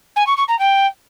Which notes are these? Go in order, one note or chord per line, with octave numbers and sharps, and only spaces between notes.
G#5
C#6
C#6
A#5
G5